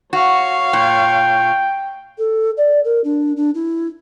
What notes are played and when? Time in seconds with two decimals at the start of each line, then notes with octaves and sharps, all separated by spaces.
0.13 F#4 C#5 F5 C#6
0.73 A#2 G5
2.18 A4
2.57 D5
2.84 A#4
3.04 D4
3.36 D4
3.54 E4